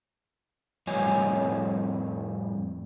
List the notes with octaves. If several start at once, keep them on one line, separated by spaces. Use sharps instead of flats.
F2 A2 G3 C#5 D#5 G#5